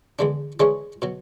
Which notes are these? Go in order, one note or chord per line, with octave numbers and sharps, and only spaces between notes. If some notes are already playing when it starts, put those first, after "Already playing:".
E2 D3 G#3 D4
E3 G#3 D4 G#4 C#5
B2 F#3